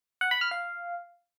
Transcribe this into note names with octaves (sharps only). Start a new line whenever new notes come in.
F#5
B5
F6
F5